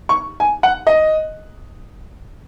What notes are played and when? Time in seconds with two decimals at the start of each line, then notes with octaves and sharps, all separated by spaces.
0.09 C#6
0.40 G#5
0.63 F#5
0.87 D#5